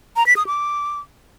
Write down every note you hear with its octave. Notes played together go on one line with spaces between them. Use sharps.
A#5
B6
D#6
D6